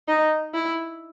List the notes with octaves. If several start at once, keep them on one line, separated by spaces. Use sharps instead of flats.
D#4
E4